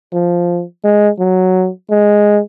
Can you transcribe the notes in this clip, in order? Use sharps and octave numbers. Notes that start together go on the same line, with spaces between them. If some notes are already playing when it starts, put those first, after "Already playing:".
F3
G#3
F#3
G#3